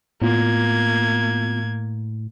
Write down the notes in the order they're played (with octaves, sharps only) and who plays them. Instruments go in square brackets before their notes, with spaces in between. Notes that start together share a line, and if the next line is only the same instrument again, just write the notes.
[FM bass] A2 [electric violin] A#3 G#6 [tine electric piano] B3 F4